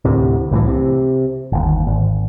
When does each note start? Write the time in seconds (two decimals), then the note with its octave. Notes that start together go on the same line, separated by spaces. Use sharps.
0.05 D2 A2 C3
0.51 C2 A2 D#3 E3
0.68 C3
1.52 G1 D#2
1.87 G#1